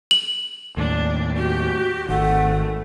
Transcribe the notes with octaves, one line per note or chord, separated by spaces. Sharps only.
F#7
D#2 A2 D4
F#4 G4
G#1 D#3 A3 F#5